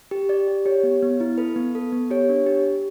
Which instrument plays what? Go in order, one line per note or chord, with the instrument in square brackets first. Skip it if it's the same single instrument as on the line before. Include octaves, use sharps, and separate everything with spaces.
[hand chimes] G4
G4 D5
G4
G4 C#5
B3
B3
E4
A4 B4
B3
A4
B3
G4 C#5
D4
G4
G4